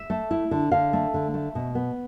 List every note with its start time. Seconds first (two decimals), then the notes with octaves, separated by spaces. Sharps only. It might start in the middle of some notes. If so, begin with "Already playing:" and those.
Already playing: E5
0.10 A3
0.31 E4
0.51 D3
0.71 D3 F5
0.93 A3
1.14 D3
1.34 A3
1.55 B2
1.75 B3